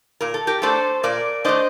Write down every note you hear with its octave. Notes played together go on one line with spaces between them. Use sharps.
A#2 A#4
A4
G4 A#4
A3 D4 A4 C5
A#2 A#4 D5
A3 D4 C5 D#5